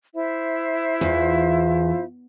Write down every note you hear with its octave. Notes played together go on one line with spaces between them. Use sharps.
E4 C5 E5
E2 F4